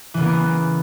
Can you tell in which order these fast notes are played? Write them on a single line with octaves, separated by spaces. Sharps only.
E3 C#3 B3 A#3